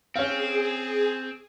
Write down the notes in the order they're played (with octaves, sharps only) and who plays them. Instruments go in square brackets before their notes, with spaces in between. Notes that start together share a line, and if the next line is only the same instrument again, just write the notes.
[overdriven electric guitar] C4 [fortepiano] C#4 F5 [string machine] G#4